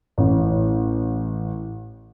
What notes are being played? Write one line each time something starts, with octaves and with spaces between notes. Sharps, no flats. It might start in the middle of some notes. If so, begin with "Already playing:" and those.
A1 A2